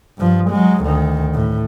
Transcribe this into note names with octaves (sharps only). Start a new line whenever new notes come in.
G2 F3
F#3 G#3
D2 D#3
A2